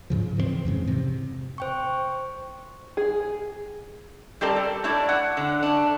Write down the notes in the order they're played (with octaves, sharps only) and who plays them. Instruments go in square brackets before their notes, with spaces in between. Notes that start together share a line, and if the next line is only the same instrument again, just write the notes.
[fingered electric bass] G#2 C#3 F3
C#3 E3 G#3 C4
F2 G#2 C#3
C3
[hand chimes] C5 G5 C#6
[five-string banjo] G#4
[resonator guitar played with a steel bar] G3 C4 G4 A4 A#4 D5
A4
A3 D4 E4 C#5 D5
F#5
D3
A3 D4